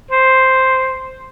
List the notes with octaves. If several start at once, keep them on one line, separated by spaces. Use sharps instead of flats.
C5